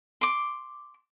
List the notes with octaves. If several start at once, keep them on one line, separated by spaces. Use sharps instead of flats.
C6 D6